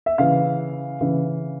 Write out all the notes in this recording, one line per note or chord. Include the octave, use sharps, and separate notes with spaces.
E5
C#3 E3 F5
C#3 E3